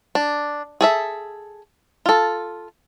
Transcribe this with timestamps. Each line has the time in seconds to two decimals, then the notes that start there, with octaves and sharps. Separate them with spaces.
0.15 D4
0.81 G#4 A4 E5
2.06 F4 A4